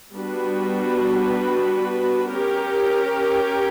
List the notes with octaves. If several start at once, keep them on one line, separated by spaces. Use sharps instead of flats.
G3 B3 D4 F#4 B4
C#4 G4 A#4